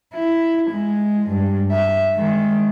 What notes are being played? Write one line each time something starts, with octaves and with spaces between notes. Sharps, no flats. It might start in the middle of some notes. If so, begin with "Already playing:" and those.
E4
G#3
G2
E5
D#3 G#3